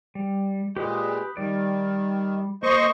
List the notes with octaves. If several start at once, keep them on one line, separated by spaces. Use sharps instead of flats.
G3
A#2 G#3 G4 B4 D#6
D#3 G3 D5
A#3 C5 D#5 C#6